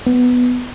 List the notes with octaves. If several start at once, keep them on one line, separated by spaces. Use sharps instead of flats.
B3